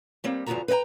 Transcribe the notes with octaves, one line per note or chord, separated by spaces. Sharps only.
G3 A#3 C4
E2 G2 D3 F3 F#4 A#5
B4 C5 D#5 G5 A#5